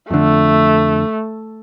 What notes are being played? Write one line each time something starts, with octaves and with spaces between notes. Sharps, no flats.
F2 D3 A3